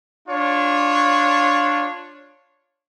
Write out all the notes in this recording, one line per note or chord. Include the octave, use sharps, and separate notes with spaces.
D4 F4 C#5